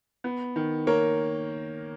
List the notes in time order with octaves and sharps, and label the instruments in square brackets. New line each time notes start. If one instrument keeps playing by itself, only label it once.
[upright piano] B3
D#3
[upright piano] A#3 [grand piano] A#4 C#5